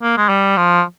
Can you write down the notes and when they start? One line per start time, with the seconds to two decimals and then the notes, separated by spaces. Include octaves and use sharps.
0.02 A#3
0.17 G#3
0.29 G3
0.57 F3